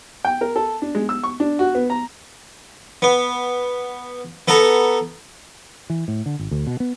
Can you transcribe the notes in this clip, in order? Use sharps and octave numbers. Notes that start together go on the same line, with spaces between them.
G5
A#4
A4
D4
G#3
E6
C#6
D4
F#4
B3
A#5
B3
B3 A4 A#5
E3
A2
D3
G#1
D2
B2
B3